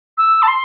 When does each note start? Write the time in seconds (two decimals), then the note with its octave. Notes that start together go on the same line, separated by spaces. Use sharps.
0.17 E6
0.42 A5
0.47 C6